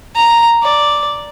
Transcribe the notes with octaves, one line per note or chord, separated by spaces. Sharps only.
A#5
D5